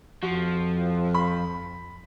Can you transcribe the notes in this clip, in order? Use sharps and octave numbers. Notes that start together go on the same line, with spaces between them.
F2 F3 F#4
B5